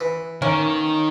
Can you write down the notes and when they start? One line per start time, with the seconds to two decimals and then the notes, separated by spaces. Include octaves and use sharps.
0.01 E3
0.42 D#3 A#3 C#4